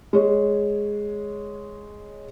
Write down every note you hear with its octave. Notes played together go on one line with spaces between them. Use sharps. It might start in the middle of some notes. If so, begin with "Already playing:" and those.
G#3 C#5